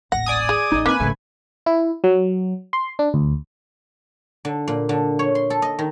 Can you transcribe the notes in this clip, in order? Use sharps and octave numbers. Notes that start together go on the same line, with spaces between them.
D#1 A1 F#5 A#6
D5 G#5 D#6
G#4
A1 D#4 D#5
A#3 C4 B4 G#5
G#1 C#3 A3
E4
F#3
C6
D4
D2
D3
A#2
D3
C#5
C6
A4
D#5
D#3